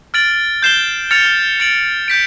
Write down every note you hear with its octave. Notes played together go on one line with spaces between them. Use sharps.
F6 A6 D7 F#7
G6 C7 E7 G7
F6 A6 C#7 F7
A6 D7 F#7
G6 B6 D7